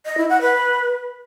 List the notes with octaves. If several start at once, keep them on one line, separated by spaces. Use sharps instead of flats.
D#5
E4
F#5
B4